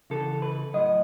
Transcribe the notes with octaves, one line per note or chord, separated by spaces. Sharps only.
C#3 E3 A4
B4
A2 F#3 D#5